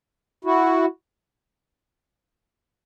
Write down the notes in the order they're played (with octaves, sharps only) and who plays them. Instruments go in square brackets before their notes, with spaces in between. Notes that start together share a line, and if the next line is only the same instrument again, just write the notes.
[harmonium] E4 F#4